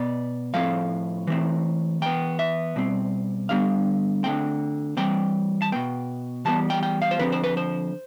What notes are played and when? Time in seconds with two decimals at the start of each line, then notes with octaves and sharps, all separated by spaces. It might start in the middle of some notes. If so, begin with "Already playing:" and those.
Already playing: B2 B3 D5
0.54 A2 F3 A3 C4 F5
1.27 E3 A3 C4
2.02 E3 B3 G5
2.39 E5
2.76 B2 G3 C4
3.49 D3 G3 B3 F5
4.23 D3 A3 C4 G5
4.97 E3 G3 C4 G5
5.62 A5
5.72 B2 B3 G5
6.45 E3 G3 B3 A5
6.70 G5
6.83 G5
7.02 F5
7.11 C5
7.19 D3 F3 C4 B4
7.32 C5
7.44 B4
7.57 C5